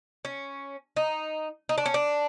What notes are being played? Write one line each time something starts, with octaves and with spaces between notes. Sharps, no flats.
C#4
D#4
D#4
D4
C#4
D4